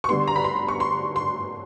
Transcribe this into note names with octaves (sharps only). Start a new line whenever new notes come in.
C#6
D3 G3 B3 C6
A#5
B5
C6
C#6
C6
C6